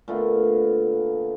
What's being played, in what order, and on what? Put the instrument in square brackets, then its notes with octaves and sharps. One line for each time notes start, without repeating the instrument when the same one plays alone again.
[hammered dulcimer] A#2 D3 A3 B3